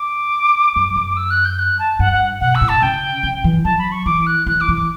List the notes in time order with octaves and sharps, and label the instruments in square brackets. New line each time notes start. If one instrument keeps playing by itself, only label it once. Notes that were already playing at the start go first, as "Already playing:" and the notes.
Already playing: [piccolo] D6
[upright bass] F#2
F#2
[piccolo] E6
F#6
G6
F#6
A5
[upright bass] G2 [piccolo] F#5
[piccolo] F#5
[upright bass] B2 [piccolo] F#5
[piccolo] E6
[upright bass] A2
[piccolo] A5
[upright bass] C#3 [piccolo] G5
[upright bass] C#3
E3
[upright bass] F#3 [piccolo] A5
[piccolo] B5
C#6
[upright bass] E3 [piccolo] D6
[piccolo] F#6
[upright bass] E3 [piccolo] F#6
[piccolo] D6
[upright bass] E3
[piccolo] D6